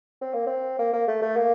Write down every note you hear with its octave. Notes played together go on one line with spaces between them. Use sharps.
C4
A#3
C4
A#3
A#3
A3
A3
A#3